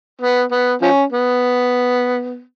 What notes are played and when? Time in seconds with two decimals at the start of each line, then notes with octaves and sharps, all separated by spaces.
0.21 B3
0.52 B3
0.82 F3 C#4
1.13 B3